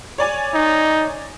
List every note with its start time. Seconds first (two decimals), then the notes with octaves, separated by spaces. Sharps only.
0.18 C#5 D5 G#5
0.54 D#4